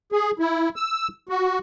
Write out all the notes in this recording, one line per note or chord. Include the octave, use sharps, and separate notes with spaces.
G#4
E4
E6
F#4